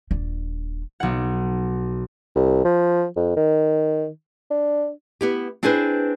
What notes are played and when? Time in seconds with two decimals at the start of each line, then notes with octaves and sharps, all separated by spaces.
0.11 D#1 D4
1.00 B1 F#5
2.35 C2
2.65 F3
3.17 F2
3.37 D#3
4.50 D4
5.21 B3 E4 G4
5.63 C4 D4 E4 G#4 B4 C5